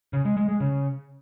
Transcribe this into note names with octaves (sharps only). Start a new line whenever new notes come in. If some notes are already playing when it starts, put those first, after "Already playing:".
C#3
G#3
G#3
G#3
C#3